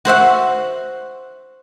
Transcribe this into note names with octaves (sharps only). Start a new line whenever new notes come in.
F#4 C5 E5 F#5